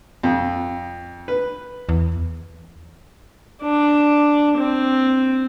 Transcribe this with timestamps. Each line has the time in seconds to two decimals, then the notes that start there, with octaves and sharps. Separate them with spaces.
0.23 F2
1.28 B4
1.89 E2
3.62 D4
4.57 C4